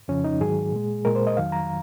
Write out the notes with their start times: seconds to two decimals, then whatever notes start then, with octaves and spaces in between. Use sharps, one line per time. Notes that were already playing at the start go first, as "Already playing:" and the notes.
0.08 F2 C#3 F3 C#4
0.24 D#4
0.40 G#2 D#3 F#3 G#4
0.73 A#2 G#3
1.05 A#2 G#3 A#4
1.16 C5
1.27 D#5
1.37 F2 D#3 F#3 F5
1.52 A#5